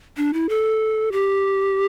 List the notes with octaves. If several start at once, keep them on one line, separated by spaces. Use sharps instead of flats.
D4
E4
A4
G4